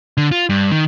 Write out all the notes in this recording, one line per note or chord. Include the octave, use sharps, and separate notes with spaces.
D3
F4
G2
D#3